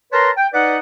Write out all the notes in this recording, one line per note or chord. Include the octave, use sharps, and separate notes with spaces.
A#4 B4 C#5 A5 A#5 C6
G5
D#4 B4 D5 D#5 F#5